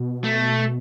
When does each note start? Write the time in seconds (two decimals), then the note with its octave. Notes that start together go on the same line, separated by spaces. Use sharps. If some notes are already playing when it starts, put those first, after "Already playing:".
Already playing: B2
0.24 A3